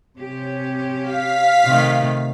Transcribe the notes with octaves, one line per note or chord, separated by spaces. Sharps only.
C3 C#4 G4
F5 B6
C3 D#3 A3